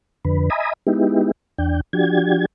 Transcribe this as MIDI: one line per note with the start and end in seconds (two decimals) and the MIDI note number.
0.25 0.50 41
0.25 0.50 50
0.25 0.50 71
0.50 0.73 75
0.50 0.73 76
0.50 0.73 80
0.50 0.73 82
0.50 0.73 83
0.50 0.73 87
0.87 1.31 56
0.87 1.31 59
0.87 1.31 63
0.87 1.31 64
0.87 1.31 67
1.58 1.81 40
1.58 1.81 62
1.58 1.81 79
1.93 2.45 53
1.93 2.45 62
1.93 2.45 66
1.93 2.45 67
1.93 2.45 92